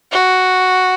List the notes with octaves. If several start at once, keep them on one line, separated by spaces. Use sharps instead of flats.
F#4